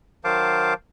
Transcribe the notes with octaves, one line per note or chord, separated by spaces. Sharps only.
D#3 F#3 C5 F5 A5 D6